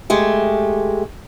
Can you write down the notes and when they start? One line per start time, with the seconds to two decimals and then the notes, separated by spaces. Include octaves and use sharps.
0.10 G#3 A3 G4